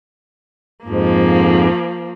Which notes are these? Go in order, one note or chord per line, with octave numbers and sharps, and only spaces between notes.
F2 G#2 F3 A#3